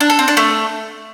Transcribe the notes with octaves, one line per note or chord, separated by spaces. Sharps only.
D4
A4
C4
D4
A3